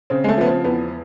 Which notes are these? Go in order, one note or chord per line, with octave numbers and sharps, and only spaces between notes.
C#3 C4
G#3
A3
F3 B3
C4
E2 B3